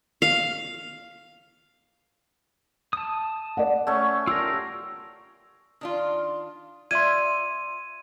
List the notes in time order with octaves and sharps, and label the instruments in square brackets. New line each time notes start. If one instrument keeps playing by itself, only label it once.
[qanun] F5
[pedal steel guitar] A5 D#6
[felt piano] D5 F#5
[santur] A3 C#4
[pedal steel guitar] F4 G4 A#4 [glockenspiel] E6 A#6
[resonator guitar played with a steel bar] D#3 D4 F4
[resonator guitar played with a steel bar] F4 D5 E5 [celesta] C6 G#6 [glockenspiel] D#7